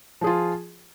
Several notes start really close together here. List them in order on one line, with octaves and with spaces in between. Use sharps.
F3 G#4 F4